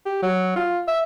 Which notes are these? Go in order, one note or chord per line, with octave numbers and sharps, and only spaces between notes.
G4
F#3
F4
E5